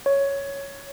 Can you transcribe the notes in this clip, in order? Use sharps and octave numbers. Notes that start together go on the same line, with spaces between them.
C#5